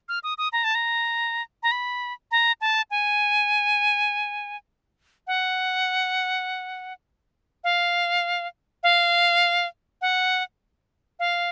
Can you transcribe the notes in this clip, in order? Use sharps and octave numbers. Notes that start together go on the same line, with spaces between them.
F6
D#6
D#6
A#5
A5
A#5
A#5
B5
A#5
A5
G#5
F#5
F5
F5
F#5
F5